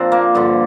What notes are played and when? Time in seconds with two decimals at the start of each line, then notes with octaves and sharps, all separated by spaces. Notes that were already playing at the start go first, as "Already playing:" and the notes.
Already playing: A#2 F3 C4 D4
0.12 A#3
0.35 G2 D3 F3